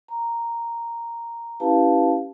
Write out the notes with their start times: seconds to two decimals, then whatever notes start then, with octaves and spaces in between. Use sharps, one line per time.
0.08 A#5
1.60 C#4 E4 G4 B4 F5 A5